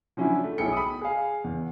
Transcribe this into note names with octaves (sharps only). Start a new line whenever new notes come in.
F3 F#3 C#4 D4 E4
A3
B1 E4 G#4 G5 C#7
B5 D#6
G#4 F5
E2